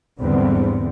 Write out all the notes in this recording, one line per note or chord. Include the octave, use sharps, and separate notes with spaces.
E2 G#2 D3 G3 B3 C4